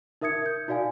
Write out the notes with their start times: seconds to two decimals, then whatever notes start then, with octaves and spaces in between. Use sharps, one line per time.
0.21 D#4 A#4 E5 D#6 G#6 C#7
0.46 G6
0.68 D#4 F#4 D5 F5 G#5